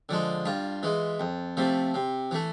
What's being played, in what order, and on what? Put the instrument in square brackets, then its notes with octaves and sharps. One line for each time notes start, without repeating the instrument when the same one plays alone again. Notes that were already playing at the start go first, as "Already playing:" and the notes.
[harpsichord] D3 F3 G#3
G2 F4
E3 G#3
F2
C3 F3 A3
C3
E3 A3